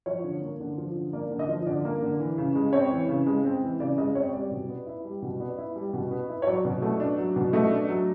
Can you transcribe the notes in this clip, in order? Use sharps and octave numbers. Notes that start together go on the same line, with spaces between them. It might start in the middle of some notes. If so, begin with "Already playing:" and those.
F3 C#5
D3
A#3
D3
F3
D3
A#3 D5
D3
D#5
F3
D3 D5
A#3
D3
E3
C#3
G#3
C4 C#5
E3
C#3
G#3
C4
E3
C#3 D5
G#3 D#5
C4 C#5
G3 D5
B2
B3
E4
G3
B2
B3 D5
E4
G3
B2
B3
E4
C#5
F#3 D5
B2
A3
D4
F#3
B2
A3 D#5
D4
F#3